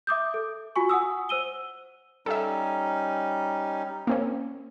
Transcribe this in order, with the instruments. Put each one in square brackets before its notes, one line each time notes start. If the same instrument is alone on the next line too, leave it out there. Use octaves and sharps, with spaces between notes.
[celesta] E5 D6 D#6 G6
A4
F4 F#4 G#5 C#6
F#5 G#5 D#6 E6
C5 E6 D#7 G7
[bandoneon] G3 C#4 D#4 [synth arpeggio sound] A4 E5
[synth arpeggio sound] A#3 C4 C#4